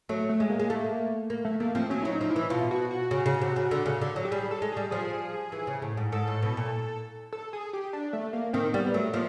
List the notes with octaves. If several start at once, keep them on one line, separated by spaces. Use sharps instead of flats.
F#3 A3
A3
G#3
A#3
G#3
A3
A#3
A3
A3 A#3
F3 C4
F#3 C#4
F#3 E4
D#4
F3
E4
E3
B2 F4
F#4
F#4
C#3
C#3
C3
C#3
D3
C#3
D3
F#3
G4
G3 G#4
A4
G#3
G3 G#4
F3 G#4
E3
C#3
A2
G#2
G#2 A4
A2
B2
A#2
A4
G#4
G4
D4
A3
A#3
D#3 C4
G3 B3
F#3 A3
F3 A#3